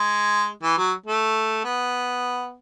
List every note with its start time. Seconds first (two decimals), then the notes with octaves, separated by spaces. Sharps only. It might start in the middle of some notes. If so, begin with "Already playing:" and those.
Already playing: G#3
0.63 E3
0.77 F#3
1.06 A3
1.64 B3